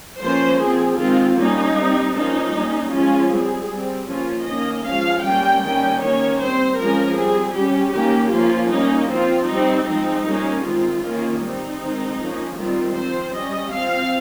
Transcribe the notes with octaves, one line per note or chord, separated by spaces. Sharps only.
F3 A#3 C#4 C5
F3 C4 G#4
D#3 G#3 C4 F4
G3 A#3 C#4 D#4
G3 C4
F3 A#3 C#4 D#4
G3 A#3 C#4
F3 G#3 C#4 F4
G3 C4 G#4
G3 C4
F3 A#3 C#4 F4
D#3 A#3 C#4 D#5
F3 G#3 C#4 F5
G3 A#3 C#4 G5
D#3 G3 A#3 C#4 G5
D#3 A#3 C#4 C#5
G3 C4 C5
F3 G#3 C#4 A#4
G3 C4 G#4
G3 C#4 G4
D#3 A#3 C#4 G4
F3 A#3 C#4 F4
G3 A#3 C#4 D#4
F3 C4 F4
G3 C4 D#4
F3 G#3 C4 D#4
G3 A#3 C#4
D#3 G#3 C4 F4
D#3 A#3 C#4
G3 C4 D#4
D#3 G#3 C4
F3 A#3 C#4
D#3 G3 C4 F4
F3 C4 C5
G3 C#4 D#5
F3 C4 F5